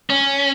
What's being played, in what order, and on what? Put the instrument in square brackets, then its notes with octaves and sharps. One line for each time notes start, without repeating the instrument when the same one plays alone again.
[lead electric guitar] C#4